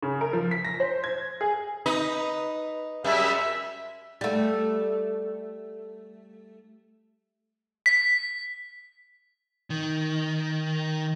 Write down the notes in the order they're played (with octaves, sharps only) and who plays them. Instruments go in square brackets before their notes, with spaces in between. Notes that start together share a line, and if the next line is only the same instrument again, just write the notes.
[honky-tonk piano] C#3
A#4
F3
B6
A#6
C5
G#6
G#4
[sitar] D#4 B4 D#5
[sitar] F#2 G3 [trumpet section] G#3 E5
[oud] G3 A3
[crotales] B6
[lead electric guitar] D#3